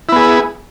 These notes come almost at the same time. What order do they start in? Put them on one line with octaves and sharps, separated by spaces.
E4 B3 G#4